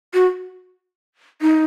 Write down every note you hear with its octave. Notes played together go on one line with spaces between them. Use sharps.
F#4
D#4